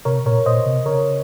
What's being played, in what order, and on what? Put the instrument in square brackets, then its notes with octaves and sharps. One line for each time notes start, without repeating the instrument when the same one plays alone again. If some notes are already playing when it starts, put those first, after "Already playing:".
[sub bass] C3 [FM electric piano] A#4 C#5
[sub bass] A#2 [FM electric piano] A#4 C#5
[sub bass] A#2 [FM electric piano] C5 D#5
[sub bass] C3
[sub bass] C#3 [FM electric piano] A#4 C#5